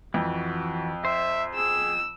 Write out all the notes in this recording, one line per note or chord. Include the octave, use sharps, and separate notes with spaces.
F2 E3 F#4
C5 E5
G#4 E6